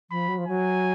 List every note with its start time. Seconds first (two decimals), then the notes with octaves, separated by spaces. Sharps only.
0.11 F3 B5
0.28 F#3
0.38 F3
0.46 F#3 G#5